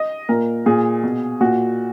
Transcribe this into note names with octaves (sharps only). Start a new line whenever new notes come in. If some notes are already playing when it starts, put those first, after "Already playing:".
Already playing: D#5
A#2 A#4
A#2 G#4
B2
A#2 F#4